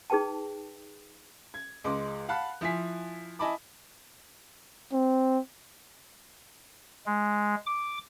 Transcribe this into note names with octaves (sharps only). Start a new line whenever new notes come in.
D#4 G#4 B4 G5 A5
G#6
C#2 G#3 C6 D6
F5 F#5 A5 B5 F#6
F3 E4 G#5 B6
E4 D#5 G#5 A5 B5 D6
C4
G#3
D6